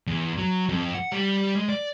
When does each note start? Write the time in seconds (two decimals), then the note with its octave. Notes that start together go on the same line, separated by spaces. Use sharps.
0.07 E2
0.38 F#3
0.69 F2
0.95 F#5
1.12 G3
1.55 G#3
1.69 D5